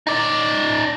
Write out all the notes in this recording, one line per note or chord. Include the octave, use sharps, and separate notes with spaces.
D#4 D5